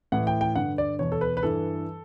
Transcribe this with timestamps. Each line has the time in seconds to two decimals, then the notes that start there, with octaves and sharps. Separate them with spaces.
0.12 A2 E3 F#5
0.27 G5
0.41 G5
0.56 G2 D3 F#5
0.78 D5
0.99 E2 B2 C#5
1.12 A4
1.21 B4
1.37 B4
1.43 G2 E3 A4